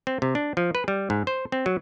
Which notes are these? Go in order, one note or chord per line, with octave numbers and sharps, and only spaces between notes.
C4
C3
D4
F3
B4
G3
G#2
C5
C4
F#3